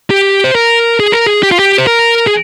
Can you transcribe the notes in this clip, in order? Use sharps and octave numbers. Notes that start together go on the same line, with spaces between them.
G4
C5
A#4
G#4
A#4
G#4
G4
F4
G4
C5
A#4
G#4